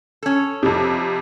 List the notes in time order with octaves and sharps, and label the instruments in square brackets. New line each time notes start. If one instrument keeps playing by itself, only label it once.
[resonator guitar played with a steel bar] C#4 A4
[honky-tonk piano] F2 C3